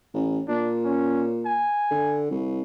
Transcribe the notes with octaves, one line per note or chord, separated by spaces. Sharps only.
A1
A#2 D4
C#4
G#5
D3
C2